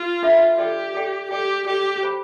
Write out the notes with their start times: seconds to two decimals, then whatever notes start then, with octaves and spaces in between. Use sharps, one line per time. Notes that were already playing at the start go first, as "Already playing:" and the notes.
Already playing: F4
0.23 D4 A4 E5 B5
0.58 G4 A4 D5 G5 C6
0.94 A4 D5 G5 C6
1.30 G4 A4 D5 G5 C6
1.66 G4 A4 D5 G5 C6
2.03 G4 C5 G5 B5